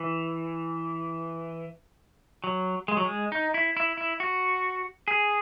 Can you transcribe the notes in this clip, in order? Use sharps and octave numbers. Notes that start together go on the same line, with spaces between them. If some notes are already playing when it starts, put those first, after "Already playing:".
Already playing: E3
F#3
G#3
F#3
G#3
D#4
E4
E4
E4
F#4
G#4